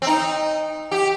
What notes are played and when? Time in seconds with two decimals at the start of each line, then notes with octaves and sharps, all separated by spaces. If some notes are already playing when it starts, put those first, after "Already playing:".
0.02 C4
0.07 D#4
0.91 G4